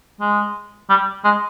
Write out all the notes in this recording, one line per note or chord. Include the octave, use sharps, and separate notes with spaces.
G#3
G3
G#3